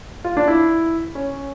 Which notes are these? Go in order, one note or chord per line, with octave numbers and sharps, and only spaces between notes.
F4
D4
E4
C#4